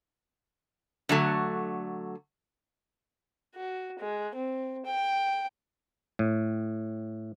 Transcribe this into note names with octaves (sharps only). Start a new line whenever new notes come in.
D3 F#3 A3
F#4
G#3
C4
G5
A2